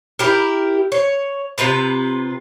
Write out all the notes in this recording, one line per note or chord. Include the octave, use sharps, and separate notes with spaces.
E4 G4 A#4
C#5
C3 F4 B4 A#5